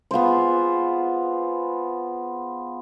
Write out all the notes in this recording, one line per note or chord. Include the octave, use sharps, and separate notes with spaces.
B3 F4 G#4 C5